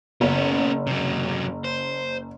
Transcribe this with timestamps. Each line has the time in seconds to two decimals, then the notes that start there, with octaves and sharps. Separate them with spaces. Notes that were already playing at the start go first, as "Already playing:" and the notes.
0.21 F#1 B3 C#4
0.87 C3 F#3
1.64 C5